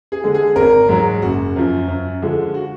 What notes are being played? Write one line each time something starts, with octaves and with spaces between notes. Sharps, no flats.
G#4
D3 G#3
G#4
G#1 A#4
G#2 F#3
F#1 F#4
F#2 F3
F#2
D3 F3 G#3
F#4